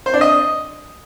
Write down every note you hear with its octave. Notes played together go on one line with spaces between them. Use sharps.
C5
D4
D#5